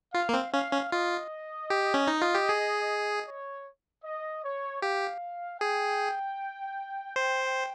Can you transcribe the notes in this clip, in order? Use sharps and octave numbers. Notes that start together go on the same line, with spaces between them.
F4 F5
A#3
C4
C#4 F5
C#4
F4 D#5
G4
C#4
D#4
F4
G4
G#4
C#5
D#5
C#5
G4 F5
G#4 G5
C5 G5